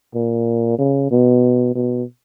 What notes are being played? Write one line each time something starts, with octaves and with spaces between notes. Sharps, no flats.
A#2
C#3
B2
B2